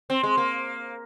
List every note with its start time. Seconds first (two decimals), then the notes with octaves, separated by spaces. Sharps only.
0.10 C4
0.23 G#3
0.37 A#3